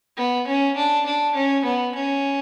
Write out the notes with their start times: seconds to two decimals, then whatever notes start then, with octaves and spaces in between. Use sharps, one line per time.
0.17 B3
0.47 C#4
0.76 D4
1.06 D4
1.35 C#4
1.65 B3
1.95 C#4